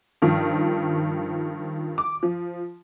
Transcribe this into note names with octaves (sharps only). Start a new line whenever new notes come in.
G2 D#3 F3
D6
F3